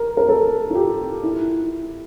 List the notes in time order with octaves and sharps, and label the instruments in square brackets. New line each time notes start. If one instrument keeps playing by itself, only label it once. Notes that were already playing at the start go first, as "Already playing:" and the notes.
Already playing: [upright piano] A#4
A#4
A4
F4
G4
E4